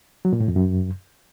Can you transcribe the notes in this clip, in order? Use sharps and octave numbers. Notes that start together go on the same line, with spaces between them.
F#3
A#2
A2
F2
F#2